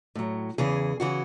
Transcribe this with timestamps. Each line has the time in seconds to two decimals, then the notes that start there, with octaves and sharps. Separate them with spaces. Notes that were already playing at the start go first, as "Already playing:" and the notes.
0.15 A2 F#3
0.58 E2 C#3 E3 G#4
1.00 C#3 E3 F#4